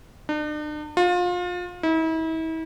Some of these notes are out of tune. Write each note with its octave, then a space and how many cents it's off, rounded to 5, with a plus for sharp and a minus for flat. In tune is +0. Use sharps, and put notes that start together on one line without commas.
D4 +45
F4 +30
E4 -40